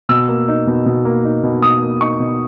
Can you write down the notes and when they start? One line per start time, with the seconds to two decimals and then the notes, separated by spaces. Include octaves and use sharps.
0.09 B2 E6
0.28 A#3
0.48 D#4
0.67 B2
0.86 B2
1.05 A#3
1.25 D#4
1.43 B2
1.62 B2 D#6
1.82 A#3
2.01 D#4 C#6
2.20 B2